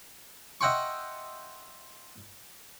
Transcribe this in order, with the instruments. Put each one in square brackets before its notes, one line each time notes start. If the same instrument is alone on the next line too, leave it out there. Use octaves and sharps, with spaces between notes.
[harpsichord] D#5 E5 F#5 G5 C6 C#6